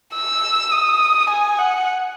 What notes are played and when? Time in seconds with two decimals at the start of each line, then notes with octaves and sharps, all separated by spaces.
0.14 E6
0.72 D#6
1.30 G#5
1.59 F#5